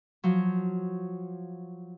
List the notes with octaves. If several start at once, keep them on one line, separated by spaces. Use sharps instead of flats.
F3 F#3